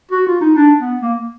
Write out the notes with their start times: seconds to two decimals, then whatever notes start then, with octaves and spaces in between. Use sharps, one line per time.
0.12 F#4
0.27 F4
0.41 D#4
0.56 D4
0.79 B3
1.01 A#3